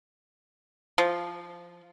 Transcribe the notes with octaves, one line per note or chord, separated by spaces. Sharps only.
F3